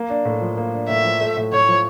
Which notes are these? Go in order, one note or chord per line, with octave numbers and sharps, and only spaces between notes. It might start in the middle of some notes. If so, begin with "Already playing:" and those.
Already playing: A#3
D4
A2
F3
A#3
D4
A2 E5
F3
A3
A2
A2 C#5
F3